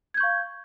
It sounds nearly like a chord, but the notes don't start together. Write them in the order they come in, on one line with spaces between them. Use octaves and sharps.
G#6 G6 C#6 F5